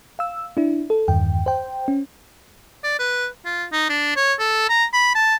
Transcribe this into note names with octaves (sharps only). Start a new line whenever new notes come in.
F5 E6
D4 E4
A4
E2 G2 D#3 G5
C5 G5
C#4
D5
B4
F4
D#4
D4
C#5
A4
A#5
B5
A5